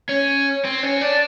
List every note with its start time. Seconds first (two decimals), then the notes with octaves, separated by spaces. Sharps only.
0.09 C#4
0.65 C4
0.83 C#4
1.01 D4